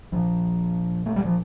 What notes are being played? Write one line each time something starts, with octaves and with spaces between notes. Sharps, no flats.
A#1 A#2 F3
A3
G3
F3